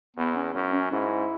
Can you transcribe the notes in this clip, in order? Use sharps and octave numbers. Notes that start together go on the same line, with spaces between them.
E2 B3
C#4
F#2 C#4
C#4
G#2 E4